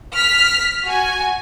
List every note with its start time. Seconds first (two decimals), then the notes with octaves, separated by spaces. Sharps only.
0.13 F6 B6
0.84 F#4 G#5